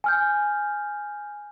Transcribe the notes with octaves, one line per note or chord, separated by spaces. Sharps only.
G#5 F6 G6